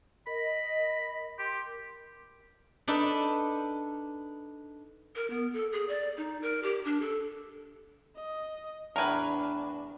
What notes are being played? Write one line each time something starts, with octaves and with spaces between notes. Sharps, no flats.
A#4 D#5 B5
G4 C6
D4 D#4 A4 B4
A#4
B3
A4
G#4
D5
D#4
A#4
G4
D4
A4
D#5
E2 A2 D4 A#4 B4 G#5